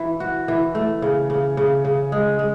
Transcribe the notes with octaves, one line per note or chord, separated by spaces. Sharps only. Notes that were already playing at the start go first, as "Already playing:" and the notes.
Already playing: E3
F#4
E3
A3
C#3
C#3
C#3
C#3
G#3
G#3